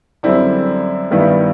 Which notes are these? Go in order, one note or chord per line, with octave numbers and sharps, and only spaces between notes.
F#2 D3 G3 C4 E4
G2 D#3 G3 B3 E4